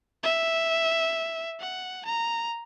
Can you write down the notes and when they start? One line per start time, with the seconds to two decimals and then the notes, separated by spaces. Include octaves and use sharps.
0.23 E5
1.60 F#5
2.05 A#5